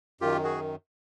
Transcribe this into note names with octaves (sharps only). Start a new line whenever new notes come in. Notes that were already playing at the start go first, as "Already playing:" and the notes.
F#2 D#3 F4 G4
F#4 G#4